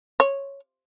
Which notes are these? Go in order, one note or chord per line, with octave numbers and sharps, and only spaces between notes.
C#5